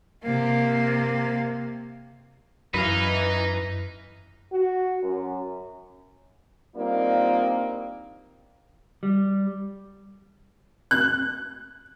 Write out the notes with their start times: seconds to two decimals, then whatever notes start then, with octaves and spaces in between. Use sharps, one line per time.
0.24 C3 A#3
2.74 F#2 E3 D#4 B4 F5
4.53 F#4
5.03 F#2
6.76 G3 A#3 C4 D4 D#4 F4
9.03 G3
10.91 F#6